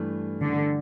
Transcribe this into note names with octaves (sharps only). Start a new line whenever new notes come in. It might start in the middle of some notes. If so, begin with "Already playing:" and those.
Already playing: G2 E3 A3
D3